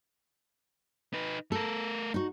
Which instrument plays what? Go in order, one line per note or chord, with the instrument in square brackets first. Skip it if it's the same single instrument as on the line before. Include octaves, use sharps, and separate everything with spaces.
[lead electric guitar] D#4 B4
[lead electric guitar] A3 A#4 [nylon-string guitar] A4
[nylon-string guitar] D#4 F#4